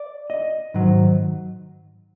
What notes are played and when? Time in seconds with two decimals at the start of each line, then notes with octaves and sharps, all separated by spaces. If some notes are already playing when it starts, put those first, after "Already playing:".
Already playing: D5
0.30 D#5
0.74 G#2 D#3 F#3